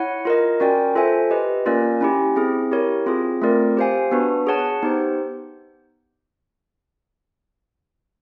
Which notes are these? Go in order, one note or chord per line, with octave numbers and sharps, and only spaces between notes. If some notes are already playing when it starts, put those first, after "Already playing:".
Already playing: E4 C#5 F#5
F4 A#4 D#5
C#4 F#4 A#4 D5 G5
F4 A4 C5 E5 G#5
G4 B4 D#5
A#3 C#4 F4 A#4 D5
C#4 E4 G4
C4 E4 G#4
E4 G4 A#4 C#5
C4 F4 G#4
A3 C4 F4 A#4 D5
G4 C5 F5 G#5
B3 D4 F#4 B4
G#4 C#5 F#5 A5
B3 D#4 G4 C5